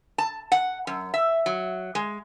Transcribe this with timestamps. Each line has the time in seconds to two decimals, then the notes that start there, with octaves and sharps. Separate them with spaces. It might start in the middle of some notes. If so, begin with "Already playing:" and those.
0.18 A5
0.52 F#5
0.87 F#2
1.14 E5
1.46 F#3
1.95 G#3